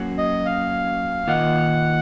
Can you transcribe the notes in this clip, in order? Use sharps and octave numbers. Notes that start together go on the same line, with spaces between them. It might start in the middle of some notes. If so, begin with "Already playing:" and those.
Already playing: F#3 A#3 C#4 F#4
D#5
F5
D#3 A#3 F4 A#4 D#5 F#5